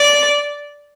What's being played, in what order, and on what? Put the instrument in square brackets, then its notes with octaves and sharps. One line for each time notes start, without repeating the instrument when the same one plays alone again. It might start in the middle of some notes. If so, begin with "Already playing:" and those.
Already playing: [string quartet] D5